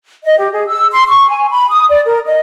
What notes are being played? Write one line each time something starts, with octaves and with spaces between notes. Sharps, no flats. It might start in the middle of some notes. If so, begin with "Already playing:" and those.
D#5
G4
G#4
E6
C6
C#6
G#5
B5
D#6
D5
A#4
D#5